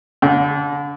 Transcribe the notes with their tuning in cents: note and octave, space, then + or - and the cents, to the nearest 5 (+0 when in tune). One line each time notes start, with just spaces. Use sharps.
D3 -30